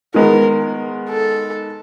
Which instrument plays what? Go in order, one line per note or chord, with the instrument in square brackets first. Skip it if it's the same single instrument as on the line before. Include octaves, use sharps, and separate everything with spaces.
[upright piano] D#3 G#3 B3 [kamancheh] A#4
[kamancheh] A4